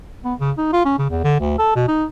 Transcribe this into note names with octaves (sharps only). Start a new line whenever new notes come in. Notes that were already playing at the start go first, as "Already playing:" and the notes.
B3
C#3
D#4
F4
C#4
C#3
E2
D3
D2
A4
B2
D#4